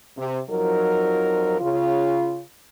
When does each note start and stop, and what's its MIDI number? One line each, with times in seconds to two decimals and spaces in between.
0.17 0.39 48
0.50 1.58 41
0.50 1.58 53
0.50 1.58 54
0.50 1.58 63
0.50 1.58 70
1.61 2.42 49
1.61 2.42 65